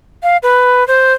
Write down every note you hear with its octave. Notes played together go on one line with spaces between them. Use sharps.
F5
B4
C5